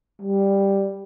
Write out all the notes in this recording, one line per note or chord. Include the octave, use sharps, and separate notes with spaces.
G3